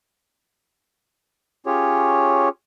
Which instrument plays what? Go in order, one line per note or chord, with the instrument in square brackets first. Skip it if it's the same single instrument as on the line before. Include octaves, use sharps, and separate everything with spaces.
[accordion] C#4 F4 G4 G#4 C#5